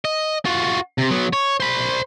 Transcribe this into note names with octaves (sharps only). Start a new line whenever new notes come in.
D#5
F4 F#4
C3
F#3 B3
C#5
C5 B5